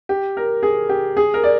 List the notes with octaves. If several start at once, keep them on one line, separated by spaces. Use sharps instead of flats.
G4
A#4
G#4
G4
G#4
A#4
D5